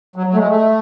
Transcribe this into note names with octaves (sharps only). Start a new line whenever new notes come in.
F#3
F#3
A3
G#3
A3